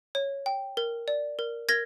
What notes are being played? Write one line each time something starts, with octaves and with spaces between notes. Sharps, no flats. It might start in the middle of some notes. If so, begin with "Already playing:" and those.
C#5
G5
A#4
D5
A#4
A#4 G#6 A#6